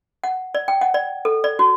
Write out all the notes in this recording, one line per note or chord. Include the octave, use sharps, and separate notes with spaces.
F#5
D5
G5
F#5
D5
A4
D5
F#4